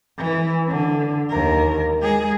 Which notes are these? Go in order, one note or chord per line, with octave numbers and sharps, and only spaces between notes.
E3
D3
D#2 A#4
G#3 G#4